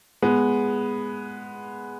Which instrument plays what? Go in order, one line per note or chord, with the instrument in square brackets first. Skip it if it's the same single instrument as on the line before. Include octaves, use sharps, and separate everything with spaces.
[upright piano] G#3 B3